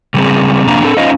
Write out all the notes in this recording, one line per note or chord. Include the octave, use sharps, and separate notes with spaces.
C#3 G3 B3 C4 G#4
F2 C3 A#3 D4 A#5
C4 D4 A4
C#4 D#4 F4 C5 D#5 F5